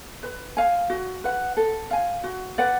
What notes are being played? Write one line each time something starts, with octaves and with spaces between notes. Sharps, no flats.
B4
F5 G#5
F#4
B4 F#5
A4
F5 G#5
F#4
B4 D5 F#5